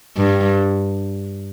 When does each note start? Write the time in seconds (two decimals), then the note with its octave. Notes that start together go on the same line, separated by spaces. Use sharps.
0.17 G2